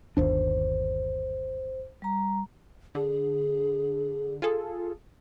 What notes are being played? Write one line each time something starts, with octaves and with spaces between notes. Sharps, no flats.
G1 D#2 D4 C5
G3 A#5
D3 G#4
F4 G#4 A4